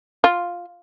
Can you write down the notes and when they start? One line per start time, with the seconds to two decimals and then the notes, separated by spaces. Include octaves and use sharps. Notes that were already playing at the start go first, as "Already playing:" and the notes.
0.24 F4